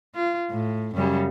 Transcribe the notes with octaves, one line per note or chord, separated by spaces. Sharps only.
F4
A2
F#2 C#3 G3